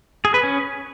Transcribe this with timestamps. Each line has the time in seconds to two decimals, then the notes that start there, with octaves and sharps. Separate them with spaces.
0.25 G#4
0.34 B4
0.43 C#4